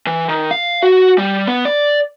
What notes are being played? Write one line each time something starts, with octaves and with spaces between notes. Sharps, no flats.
E3
D#3
F5
F#4
G3
B3
D5